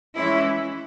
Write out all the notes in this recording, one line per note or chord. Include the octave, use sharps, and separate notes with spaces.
E3 G#3 C#4 E4